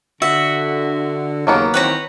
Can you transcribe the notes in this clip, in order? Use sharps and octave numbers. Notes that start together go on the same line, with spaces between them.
D3 F#4 E5
D#2 C#3 F#3 A#3 B3
D#3 E3 C4 B4 C#5 A#5